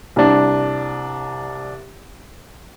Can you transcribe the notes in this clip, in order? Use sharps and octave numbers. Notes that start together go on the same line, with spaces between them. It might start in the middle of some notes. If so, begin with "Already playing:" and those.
C2 D4